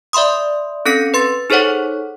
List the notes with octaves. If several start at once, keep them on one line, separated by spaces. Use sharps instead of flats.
D5 E5 B5 C6 D#6
C4 C#4 A4 A#6 C#7
B4 C6 A6
D#4 G#4 A4 C5 C#5 F#5